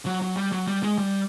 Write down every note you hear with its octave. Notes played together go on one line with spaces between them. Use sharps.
F#3
F#3
G3
F#3
G3
G#3
G3